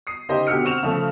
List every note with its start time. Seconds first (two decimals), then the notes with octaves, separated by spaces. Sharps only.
0.07 D#6 C7
0.29 C#3 D#4 G4 C5 D#5 D#6
0.47 D2 B2 G4 E6 F6 C#7
0.64 C4 F#5 C#6 E7 F7
0.83 C#3 F3 A3